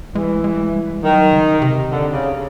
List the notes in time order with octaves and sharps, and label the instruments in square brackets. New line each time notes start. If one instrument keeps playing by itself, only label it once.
[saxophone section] E3 [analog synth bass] G#3
[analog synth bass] G#3
G3
[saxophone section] D#3 [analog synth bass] F#3
[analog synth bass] C#3
C3
[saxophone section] D3
C#3